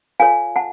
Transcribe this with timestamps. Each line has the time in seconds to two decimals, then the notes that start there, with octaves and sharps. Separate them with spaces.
0.20 F4 A4 C#5 F5 G#5
0.56 F#5 A5